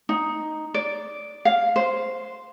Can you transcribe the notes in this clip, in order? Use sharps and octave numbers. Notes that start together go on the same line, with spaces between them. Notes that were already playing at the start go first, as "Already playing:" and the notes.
D#4
D5
F5
C5